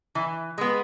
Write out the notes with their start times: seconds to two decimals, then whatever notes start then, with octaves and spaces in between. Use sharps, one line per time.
0.15 E3
0.58 G#3 B3